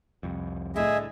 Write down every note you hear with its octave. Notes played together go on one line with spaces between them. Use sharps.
C2 F2
A2 D3 G#4 D#5 E5